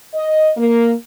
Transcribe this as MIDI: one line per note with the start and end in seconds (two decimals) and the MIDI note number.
0.14 0.51 75
0.57 0.92 58